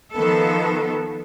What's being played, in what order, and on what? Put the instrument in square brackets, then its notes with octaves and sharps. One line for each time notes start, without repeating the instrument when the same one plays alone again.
[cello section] D#3 F3 B3 A4